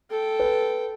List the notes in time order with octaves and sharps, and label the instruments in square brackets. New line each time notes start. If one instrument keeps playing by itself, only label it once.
[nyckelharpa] A4 G5
[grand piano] B4